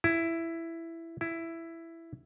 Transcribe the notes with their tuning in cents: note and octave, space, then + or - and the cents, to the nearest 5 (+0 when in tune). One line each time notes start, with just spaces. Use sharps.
E4 +10
E4 +10